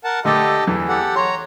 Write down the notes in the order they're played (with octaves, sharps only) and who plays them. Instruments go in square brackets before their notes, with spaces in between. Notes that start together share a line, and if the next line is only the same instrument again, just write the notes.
[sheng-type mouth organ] A#4 F#5 A5
[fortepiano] D3 A3 [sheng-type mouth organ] G4 A4 D#5
[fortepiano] E2 E3
[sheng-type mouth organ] G4 A4 F#5
[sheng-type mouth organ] C#5 A#5 [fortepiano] C6